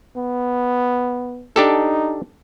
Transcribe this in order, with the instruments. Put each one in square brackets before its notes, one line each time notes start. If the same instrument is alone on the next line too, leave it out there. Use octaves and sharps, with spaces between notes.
[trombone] B3
[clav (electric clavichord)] D4 G4 A4 [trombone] D#4